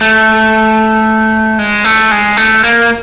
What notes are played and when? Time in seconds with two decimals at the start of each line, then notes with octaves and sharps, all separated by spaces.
0.01 A3
1.59 G#3
1.84 A3
2.11 G#3
2.37 A3
2.64 A#3